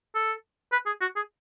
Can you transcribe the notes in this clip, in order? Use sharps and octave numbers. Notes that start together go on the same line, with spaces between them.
A4
B4
G#4
F#4
G#4